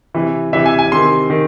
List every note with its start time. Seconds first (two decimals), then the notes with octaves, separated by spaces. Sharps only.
0.14 C3 E3
0.53 C3 E3 E5
0.66 G#5
0.79 G#5
0.92 C3 D#3 C6
1.30 D#3